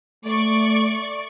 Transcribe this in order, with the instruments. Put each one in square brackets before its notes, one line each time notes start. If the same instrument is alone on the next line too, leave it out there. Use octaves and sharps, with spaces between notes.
[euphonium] A3 [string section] D5 C#6